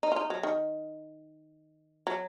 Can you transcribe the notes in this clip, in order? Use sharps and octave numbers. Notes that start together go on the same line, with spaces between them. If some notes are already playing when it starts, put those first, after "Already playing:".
D#4
F4
D#4
F#3
D#3
F#3